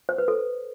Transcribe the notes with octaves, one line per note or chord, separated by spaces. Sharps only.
C5
B4
A4